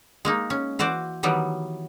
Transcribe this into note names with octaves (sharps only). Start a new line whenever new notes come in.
G#3 A#3 D#4
C#4
E3 F#4 C5 D5
D#3 E3 F#3 G3 B3